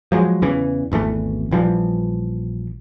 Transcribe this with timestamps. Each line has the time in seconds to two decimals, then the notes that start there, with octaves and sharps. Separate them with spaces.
0.12 F3 F#3 G#3
0.42 E2 C#3 E3
0.92 G#1 E2 E3 A3
1.51 A#1 E3 F3 G3